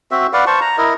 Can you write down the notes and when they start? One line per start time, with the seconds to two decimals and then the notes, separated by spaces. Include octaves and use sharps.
0.11 C4 F#4 E5
0.33 B4 D5 F5 F#5
0.47 C5 A5 C#6
0.61 A#5
0.78 E4 A#4 D#5